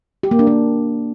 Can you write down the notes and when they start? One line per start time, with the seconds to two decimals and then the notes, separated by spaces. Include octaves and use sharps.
0.23 G4
0.31 A#3
0.39 D4
0.47 A#3